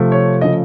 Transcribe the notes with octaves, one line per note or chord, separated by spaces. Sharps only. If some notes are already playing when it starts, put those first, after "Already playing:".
Already playing: C3 F3 A3
C#5
C#3 F3 A3 D#5